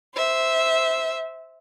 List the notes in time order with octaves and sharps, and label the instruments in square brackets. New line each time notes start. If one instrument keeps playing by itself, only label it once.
[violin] C5 E5